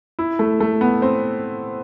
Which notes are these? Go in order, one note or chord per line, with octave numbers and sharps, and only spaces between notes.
E4
A3
A3
B3
C4